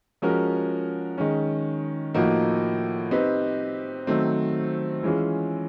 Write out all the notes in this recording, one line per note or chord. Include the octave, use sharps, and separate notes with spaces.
F3 G#3 C#4 F#4 A#4
D#3 G#3 C#4
A2 F3 A#3 D#4 F#4
C4 D#4 G4 B4
D#3 F#3 A3 C4
E3 G#3 C#4 F4 G#4